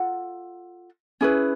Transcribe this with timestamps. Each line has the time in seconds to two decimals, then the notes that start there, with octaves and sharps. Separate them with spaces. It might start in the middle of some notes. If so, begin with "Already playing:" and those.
Already playing: F4 A4 F#5
1.21 C#4 E4 G#4 B4